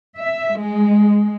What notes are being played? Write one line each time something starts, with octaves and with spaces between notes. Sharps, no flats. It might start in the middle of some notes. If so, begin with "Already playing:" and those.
E5
G#3